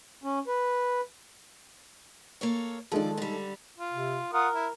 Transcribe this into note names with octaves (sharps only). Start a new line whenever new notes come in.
C#4
B4
A#3 A4 C#5
D#3 F3 G#3 A4 D5
D3 G3
F4
C3
F4 A#4 F#5 D#6
E4